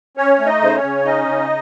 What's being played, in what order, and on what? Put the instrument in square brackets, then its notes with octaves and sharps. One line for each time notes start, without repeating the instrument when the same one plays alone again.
[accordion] C#4 C#5
A3
D#4 D#5
C#3 C5
C#4 C#5
C#3
C#4 D#4 D#5
C#3